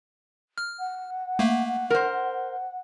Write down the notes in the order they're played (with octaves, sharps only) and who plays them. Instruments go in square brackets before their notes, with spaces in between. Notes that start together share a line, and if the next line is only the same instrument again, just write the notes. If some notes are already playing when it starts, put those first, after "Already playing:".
[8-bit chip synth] F6
[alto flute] F#5
[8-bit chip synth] A3 A#3
[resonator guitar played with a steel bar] A#4 C5